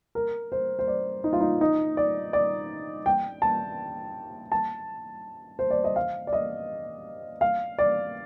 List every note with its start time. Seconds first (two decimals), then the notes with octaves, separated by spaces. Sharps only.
0.15 A#4
0.52 C5
0.79 C5
0.87 D5
1.24 D#4
1.33 F4
1.41 D#4
1.61 D#4
1.97 D5
2.33 D5
3.06 G5
3.42 A5
4.52 A5
5.59 C5
5.71 D5
5.84 D#5
5.96 F5
6.27 D5
6.33 D#5
7.41 F5
7.79 D5